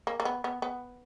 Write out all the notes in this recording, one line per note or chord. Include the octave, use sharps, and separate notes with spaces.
A#3
A#3
B3
B3
B3